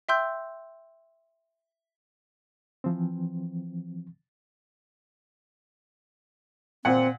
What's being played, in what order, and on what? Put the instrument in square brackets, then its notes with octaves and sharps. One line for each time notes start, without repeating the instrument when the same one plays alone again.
[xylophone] E5 G5 C6 E6 G6
[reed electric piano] E3 F3 C4
[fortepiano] A#2 F#5 [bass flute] C4